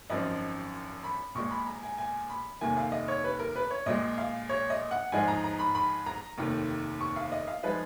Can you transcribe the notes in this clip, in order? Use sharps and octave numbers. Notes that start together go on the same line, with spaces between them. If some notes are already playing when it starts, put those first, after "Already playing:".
G#1 F#2 F3 D#5
B5
A#1 A#2 G#3 C#6
B5
A#5
G#5
G#5
B5
F1 D#2 D#3 A#3 G#5
F5
D#5
C#5
B4
A#4
B4
C#5
A#1 A#2 G#3 D#5
F5
C#5
D#5
F#5
G#2 F3 G#3 D#4 G#5
A#5
A#5
B5
B5
A#5
F1 D#2 D#3
C#6
F5
D#5
F5
F3 G#3 D#4 B4